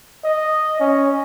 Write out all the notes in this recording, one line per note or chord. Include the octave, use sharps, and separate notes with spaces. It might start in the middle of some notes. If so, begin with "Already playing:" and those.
D#5
C#4